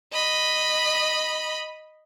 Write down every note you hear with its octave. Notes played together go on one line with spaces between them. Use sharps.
D#5 B5